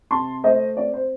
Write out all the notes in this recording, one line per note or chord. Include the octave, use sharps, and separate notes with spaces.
C3 A5 C6
A3 C5 D#5
C4 D5
C5